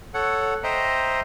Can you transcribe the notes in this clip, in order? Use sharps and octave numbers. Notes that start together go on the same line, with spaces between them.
A4 C#5 F#5
C5 D#5 E5 G5 A#5